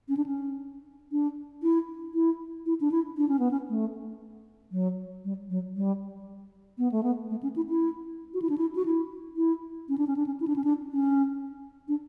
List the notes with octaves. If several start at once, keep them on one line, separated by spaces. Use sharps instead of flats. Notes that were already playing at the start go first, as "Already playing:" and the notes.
C#4
D4
C#4
D4
E4
E4
E4
D4
E4
D4
C#4
B3
C#4
A3
F#3
G3
F#3
G3
B3
A3
B3
A3
C#4
E4
E4
F#4
E4
D4
E4
F#4
E4
E4
C#4
D4
C#4
D4
C#4
E4
D4
C#4
D4
C#4
D4